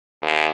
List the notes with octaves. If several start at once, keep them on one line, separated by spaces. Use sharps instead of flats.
D#2